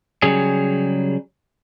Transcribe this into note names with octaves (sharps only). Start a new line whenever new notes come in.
C#3 F#3 G3 G#4